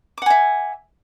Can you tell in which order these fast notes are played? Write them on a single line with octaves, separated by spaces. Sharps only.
D6 F#5 G#5 E5